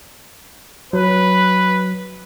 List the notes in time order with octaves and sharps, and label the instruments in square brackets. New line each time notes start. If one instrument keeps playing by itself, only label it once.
[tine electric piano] F#3 [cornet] B4